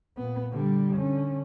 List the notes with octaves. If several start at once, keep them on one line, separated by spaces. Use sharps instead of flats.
A#2 B3
D3 G3
D3 C#4